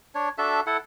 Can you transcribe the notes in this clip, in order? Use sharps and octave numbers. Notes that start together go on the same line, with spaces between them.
D4 C#5
D4 F#4 A4 E5
E4 A4 F#5